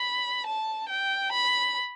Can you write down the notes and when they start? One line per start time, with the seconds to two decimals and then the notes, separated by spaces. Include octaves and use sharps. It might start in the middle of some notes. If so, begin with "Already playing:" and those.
Already playing: B5
0.46 A5
0.89 G5
1.32 B5